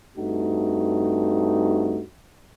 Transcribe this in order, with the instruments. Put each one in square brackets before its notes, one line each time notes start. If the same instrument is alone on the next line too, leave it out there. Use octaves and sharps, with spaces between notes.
[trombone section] G2 A3 C4 D#4 F#4